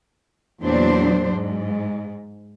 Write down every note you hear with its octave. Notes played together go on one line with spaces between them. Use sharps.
E2 A#2 F#3 D4 C5
G#2